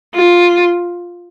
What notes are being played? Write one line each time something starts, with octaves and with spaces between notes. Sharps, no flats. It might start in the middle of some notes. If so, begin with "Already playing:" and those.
F4